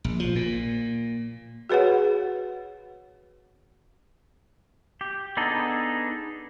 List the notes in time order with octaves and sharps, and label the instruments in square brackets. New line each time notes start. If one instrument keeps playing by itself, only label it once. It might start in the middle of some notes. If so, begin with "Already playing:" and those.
[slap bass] A#1
F3
A#2
[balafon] F#4 G#4 B4 C#5 F#5
[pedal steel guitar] G4
B3 D4 D#4 G#4 A4